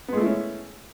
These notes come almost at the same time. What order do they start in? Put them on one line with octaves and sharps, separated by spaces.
B3 G#3 A3 E4 C#4